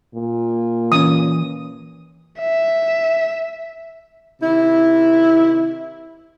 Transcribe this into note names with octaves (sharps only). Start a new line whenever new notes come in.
A#2
E3 C#4 D#6
E5
C3 D#3 E4